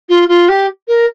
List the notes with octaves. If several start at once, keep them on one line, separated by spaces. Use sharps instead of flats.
F4
F4
G4
A#4